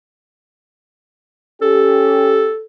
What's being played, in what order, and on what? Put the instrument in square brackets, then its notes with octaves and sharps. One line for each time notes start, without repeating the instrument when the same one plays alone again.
[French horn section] C#4 G4 [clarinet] A4